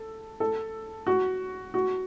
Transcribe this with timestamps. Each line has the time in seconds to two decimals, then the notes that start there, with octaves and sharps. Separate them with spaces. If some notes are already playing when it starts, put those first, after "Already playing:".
Already playing: A4
0.40 A4
1.07 F#4
1.74 F#4